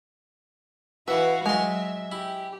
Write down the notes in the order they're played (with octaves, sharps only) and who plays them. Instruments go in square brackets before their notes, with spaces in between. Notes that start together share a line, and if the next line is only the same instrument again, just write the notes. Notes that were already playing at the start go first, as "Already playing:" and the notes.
[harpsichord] E3 E5 [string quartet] E4 F#4 F5 [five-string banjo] B4
[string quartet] F#3 E5 [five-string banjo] G#3 [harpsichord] F5 C6
[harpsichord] E4 [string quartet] G4